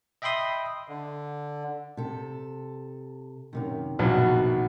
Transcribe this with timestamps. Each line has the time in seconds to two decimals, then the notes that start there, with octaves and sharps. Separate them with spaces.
0.22 D#5 E5 G5 B5 C6 D#6
0.88 D3
1.97 C3 A4
3.53 F#2 C3 D#3
3.99 A#1 B2 F#3